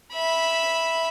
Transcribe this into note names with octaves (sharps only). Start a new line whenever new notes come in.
E5 B5